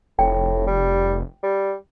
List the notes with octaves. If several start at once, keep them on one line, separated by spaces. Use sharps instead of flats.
F1 A2 G5
G3
G3